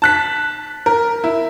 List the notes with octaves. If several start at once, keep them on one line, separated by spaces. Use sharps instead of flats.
A5 F#6 B6
A#4
E4